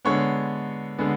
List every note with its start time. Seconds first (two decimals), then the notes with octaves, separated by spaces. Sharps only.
0.05 D3 G#3 B3 C#5 C#6
0.98 D3 G#3 B3